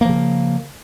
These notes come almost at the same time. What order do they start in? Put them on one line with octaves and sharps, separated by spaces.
A#3 F3 C#3